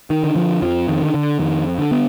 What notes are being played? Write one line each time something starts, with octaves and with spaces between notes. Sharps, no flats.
D#3
D3
F3
F2 F3
D#3
D3
D3
F2 D#3
D3
B3